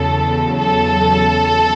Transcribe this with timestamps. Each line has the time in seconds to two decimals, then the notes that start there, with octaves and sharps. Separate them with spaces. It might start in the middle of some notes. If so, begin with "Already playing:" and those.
Already playing: E2 C#3 F#3 A4
0.58 A4